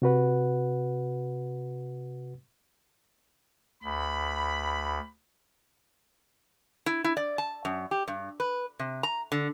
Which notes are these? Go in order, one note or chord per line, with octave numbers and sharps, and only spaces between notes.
C3 F#4 B4 F#5
D2 B5
E4
E4
D5
A5
F#2
G4
G2
B4
C3
A#5
D3